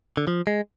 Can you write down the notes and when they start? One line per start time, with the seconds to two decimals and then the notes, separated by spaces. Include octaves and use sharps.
0.17 D3
0.27 F3
0.47 G#3